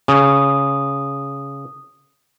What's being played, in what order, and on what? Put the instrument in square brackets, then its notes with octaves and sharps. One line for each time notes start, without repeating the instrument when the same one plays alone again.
[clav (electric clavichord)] C#3 [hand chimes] D#6